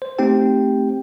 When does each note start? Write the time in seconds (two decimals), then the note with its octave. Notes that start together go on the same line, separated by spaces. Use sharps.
0.02 C5
0.19 A3 C4 D#4 G4 G5